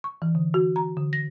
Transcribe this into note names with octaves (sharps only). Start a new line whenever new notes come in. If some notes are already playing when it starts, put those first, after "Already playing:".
C#6
E3
D3
F#4
A#5
D3
A#6